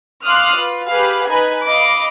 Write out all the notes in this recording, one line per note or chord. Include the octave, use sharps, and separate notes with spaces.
F5 C6 D6 D#6 F6 F#6
F4 B4
G4 G#4 B4 F5
D#4 B4 G#5 B5
D#5 F5 B5 D6